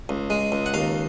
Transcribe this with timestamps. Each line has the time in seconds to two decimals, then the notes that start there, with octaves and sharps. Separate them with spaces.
0.09 C#2
0.30 G#3
0.52 C#2
0.66 F#5
0.74 D#2 F5